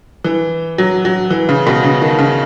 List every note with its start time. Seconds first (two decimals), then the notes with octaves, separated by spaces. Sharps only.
0.24 E3
0.78 F#3
1.05 F#3
1.30 E3
1.49 C#3
1.67 B2
1.84 C#3
2.02 D#3
2.18 C#3